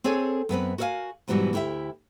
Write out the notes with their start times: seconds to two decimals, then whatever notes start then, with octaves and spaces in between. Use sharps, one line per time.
0.04 C4 G#4 A4 C#5 G#5
0.49 F#2 B3 C4 B4
0.78 F#4 A#4 C#5 E5 F5 G#5
1.28 G#2 B2 E3 F#3 G3 F#4
1.53 D2 E4 G4 E5 G5